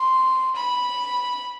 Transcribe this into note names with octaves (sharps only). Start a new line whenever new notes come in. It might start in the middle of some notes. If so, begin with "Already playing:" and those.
Already playing: C6
B5